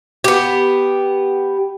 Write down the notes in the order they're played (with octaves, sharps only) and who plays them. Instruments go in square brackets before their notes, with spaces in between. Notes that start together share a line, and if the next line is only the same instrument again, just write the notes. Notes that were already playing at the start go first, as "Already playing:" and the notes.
[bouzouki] B3 G4